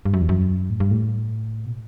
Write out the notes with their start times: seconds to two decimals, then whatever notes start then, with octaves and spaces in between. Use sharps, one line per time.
0.05 G2
0.14 F#2
0.21 E2
0.29 F#2
0.70 A2
0.80 G2
0.91 A2
1.66 B2